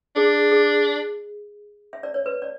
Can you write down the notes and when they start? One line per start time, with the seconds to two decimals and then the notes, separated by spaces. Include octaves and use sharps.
0.16 D4 G#4
0.51 G#4
1.93 E5
2.03 D5
2.14 C#5
2.26 B4
2.42 D5